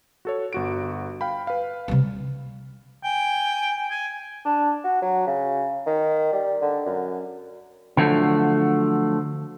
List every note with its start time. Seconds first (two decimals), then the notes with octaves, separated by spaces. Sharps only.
0.25 F#4 A4 C#5
0.53 G1 F#4 D7
1.21 F5 G5 B5
1.47 B4 F5
1.88 C3 G3
3.03 G5 G#5
3.91 G#5
4.45 D4
4.84 F#4
5.02 F#3
5.27 C#3
5.86 D#3
6.33 G3
6.62 D3
6.86 F#2
7.97 D3 F3 F#3 A3